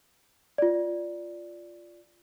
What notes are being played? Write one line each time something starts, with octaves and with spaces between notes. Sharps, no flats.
F4 D5